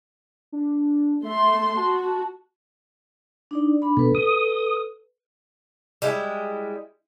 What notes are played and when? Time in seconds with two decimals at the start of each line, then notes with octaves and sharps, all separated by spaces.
0.52 D4
1.25 A3 E5 C6
1.76 F#4 A5
3.51 D4 D#4 D5
3.82 D4 B5
3.97 B2 A4 B4
4.15 D#6
6.02 G3 G#3 E4